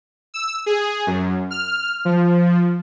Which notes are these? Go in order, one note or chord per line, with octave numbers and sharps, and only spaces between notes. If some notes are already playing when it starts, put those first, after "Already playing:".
E6
G#4
F#2
F6
F3